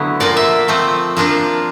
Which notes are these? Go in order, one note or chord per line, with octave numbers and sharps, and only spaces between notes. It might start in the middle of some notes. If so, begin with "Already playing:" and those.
Already playing: D3 F#3 A3 B3 E4
A#2 F3 A#3 D5
E5
F3 A3 C4
F3 A#3 D4 F4